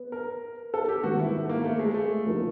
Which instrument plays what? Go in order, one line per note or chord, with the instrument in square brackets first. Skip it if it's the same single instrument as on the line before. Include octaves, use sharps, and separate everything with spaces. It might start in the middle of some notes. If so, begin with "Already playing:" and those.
Already playing: [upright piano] B3
[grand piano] A#4
A4
G4
[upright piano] G#2 D#3 G3 B3 [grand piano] F#4
[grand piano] E4
A3
A#3
A3
G#3
A3
[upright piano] D2 C3 F3 A#3 D#4